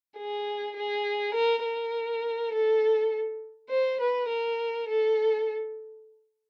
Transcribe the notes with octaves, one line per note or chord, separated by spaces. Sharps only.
G#4
G#4
A#4
A#4
A4
C5
B4
A#4
A4